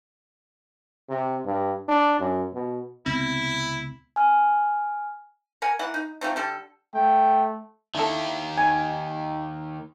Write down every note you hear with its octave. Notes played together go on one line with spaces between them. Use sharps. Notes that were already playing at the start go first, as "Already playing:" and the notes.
C3
G2
D4
F#2
B2
C#2 C3 B3 C4 E4
G#5 F6
A#4 F#5 G#5
E3 A#3 F#5
D#4
F3 A3 C4 D#4
D3 G3 A4
A3 G5
D#3 A#3 D4 E4 A4
D#4 G#5